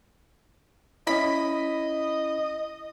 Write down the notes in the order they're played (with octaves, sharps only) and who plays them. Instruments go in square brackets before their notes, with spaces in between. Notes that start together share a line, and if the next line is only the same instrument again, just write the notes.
[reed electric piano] C#4 E4 [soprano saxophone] D#5 [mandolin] B5